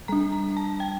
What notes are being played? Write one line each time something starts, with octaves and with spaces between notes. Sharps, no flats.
G3 D4 A#5
A#5
A5
G5